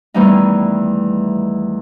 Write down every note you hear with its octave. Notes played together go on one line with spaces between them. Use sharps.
E2 D#3 E3 G3 A3 D#4